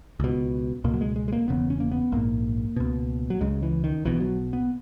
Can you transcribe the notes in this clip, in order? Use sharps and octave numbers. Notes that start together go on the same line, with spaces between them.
C#2 B2
C#2 B2 A#3
F#3
G#3
G#3
G#3
A#3
E1 E2 C#3 B3
C#4
A#3
B3
A#1 G#2 A#3
C#2 B2
F#3
C#2 C#3 G#3
E3
D#3
B1 B2 E3
F#3
B3